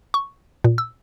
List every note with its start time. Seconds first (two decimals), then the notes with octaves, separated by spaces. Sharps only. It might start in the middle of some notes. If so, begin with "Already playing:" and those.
0.14 C#6
0.64 A#2
0.78 E6